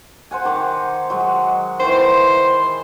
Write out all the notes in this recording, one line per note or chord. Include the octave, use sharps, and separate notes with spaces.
C5 F#5 G#5
D#3 A#5 D6
F#3 G#3
D#3 E3 C5